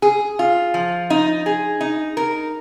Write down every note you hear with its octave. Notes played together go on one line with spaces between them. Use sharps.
G#4
F4
F3
D#4
G#4
D#4
A#4